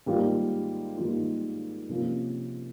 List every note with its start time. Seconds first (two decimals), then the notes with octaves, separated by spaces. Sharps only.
0.06 G#2 D#3 G3 A#3 F4
0.97 G#2 D#3 G3 A#3 F4
1.89 C3 F3 A#3 C#4 F4